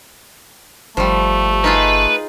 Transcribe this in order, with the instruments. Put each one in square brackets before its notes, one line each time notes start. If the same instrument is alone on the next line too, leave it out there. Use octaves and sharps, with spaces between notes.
[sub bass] G1 [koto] F3 G3 [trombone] A3
[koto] D#4 F4 G#4 [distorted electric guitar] B4